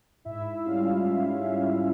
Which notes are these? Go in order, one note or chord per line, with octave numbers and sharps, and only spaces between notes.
G#2 E4 E5
G3 C#4 F4 F5
G#2
G3 C#4